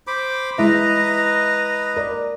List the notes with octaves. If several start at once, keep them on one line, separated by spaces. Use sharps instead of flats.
C5 B5 D6
G#3 E4 B4 D#5 E5 A#5
A#4 D5